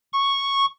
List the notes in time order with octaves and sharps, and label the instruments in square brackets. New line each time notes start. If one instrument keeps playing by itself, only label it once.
[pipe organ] C#6